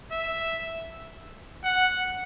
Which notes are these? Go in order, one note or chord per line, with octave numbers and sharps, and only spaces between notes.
E5
F#5